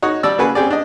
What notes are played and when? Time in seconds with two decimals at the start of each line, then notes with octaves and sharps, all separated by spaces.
0.02 D#4 F#4 C#5
0.23 G3 D5 A5 E6
0.38 C#3 A#3 F#4 G#4 B4
0.55 C4 C#4 G4 G#4 D5
0.70 D4 D#5